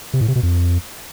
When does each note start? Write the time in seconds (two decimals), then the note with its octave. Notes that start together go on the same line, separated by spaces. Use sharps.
0.14 C3
0.21 A2
0.28 C3
0.36 B2
0.43 F2